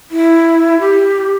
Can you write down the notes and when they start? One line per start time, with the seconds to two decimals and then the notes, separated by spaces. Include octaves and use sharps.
0.11 E4
0.80 G4